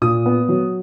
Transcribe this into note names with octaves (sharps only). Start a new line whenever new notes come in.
A#2 D#6
B3
F#3